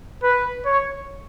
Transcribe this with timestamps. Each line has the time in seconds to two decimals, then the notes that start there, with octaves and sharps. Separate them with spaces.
0.23 B4
0.65 C#5